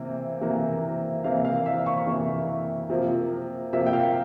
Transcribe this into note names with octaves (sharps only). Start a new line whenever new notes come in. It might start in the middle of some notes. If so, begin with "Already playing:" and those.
Already playing: C3 E3 A#3
C3 E3 A#3
C3 E3 A#3 F5
F5
E5
C#6
C3 E3 A#3
C3 F3 A#3
C3 F3 A#3 E5
G5
F5